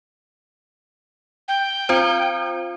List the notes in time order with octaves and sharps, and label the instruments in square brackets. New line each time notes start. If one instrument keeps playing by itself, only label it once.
[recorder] G5
[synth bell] C4 F4 C5